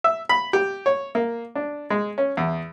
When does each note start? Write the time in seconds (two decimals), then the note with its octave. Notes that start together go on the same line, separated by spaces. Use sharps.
0.04 E5
0.29 B5
0.53 G4
0.86 C#5
1.15 A#3
1.55 D4
1.90 G#3
2.18 C#4
2.37 E2